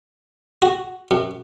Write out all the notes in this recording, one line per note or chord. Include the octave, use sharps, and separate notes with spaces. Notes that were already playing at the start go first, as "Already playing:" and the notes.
F#4
F#2